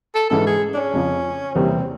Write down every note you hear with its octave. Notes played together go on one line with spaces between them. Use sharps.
A4
G#2 E3 G#3 C#4 E4 A4
G#4
D4
C#4
F2 C#3 F3
E2 C3 E3 G3 A#3 C4